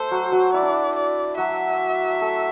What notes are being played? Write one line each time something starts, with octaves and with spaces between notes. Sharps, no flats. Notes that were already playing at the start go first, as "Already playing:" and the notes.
Already playing: A3 A4 C5
F#3 F#4
F#3 F#4
E4 D5
D4
E4
D5
F#3 F#4 E5
A3 A4